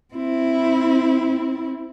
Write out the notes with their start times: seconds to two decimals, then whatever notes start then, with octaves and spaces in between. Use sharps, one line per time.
0.14 C4 E4